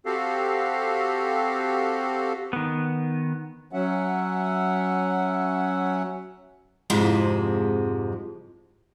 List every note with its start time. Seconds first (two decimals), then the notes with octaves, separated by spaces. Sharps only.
0.06 C4 F#4 G4 A4 F5
2.53 D#3 B3
3.73 F#3 C#4 E5 F#5
6.90 F2 G#2 C3 F3 G#3